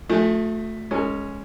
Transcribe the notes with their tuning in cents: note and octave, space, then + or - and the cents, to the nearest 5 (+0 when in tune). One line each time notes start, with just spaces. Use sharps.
F3 +45 A3 +0 G#5 +0
G#3 +0 C#4 +0 A#4 -45